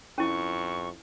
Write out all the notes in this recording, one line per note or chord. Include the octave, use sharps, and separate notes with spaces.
F2 C#4 E4 C#6